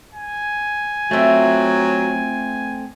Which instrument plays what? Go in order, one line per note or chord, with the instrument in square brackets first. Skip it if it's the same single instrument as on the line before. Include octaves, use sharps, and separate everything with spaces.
[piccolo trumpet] G#5
[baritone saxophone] F#3 [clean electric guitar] A3 C4 [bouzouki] F4 E5